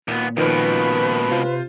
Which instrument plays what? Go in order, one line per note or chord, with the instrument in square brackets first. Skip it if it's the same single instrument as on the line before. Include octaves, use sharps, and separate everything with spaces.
[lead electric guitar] D#2 B3 [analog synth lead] A#2
[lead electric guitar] C#2 B2 [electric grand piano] D#3 F3 A#3 [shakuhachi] B4
[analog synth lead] C3 [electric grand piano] F4 C5